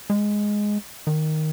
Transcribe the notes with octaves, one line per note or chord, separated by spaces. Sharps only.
G#3
D#3